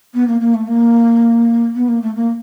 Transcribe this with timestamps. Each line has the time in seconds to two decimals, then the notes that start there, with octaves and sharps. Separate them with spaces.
0.14 B3
0.27 A#3
0.40 A#3
0.54 A3
0.67 A#3
1.75 B3
1.88 A#3
2.02 A3
2.15 A#3